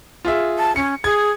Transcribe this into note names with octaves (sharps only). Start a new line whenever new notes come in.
F4 G#4 E5
A5
C#4 C#7
G#4 G#6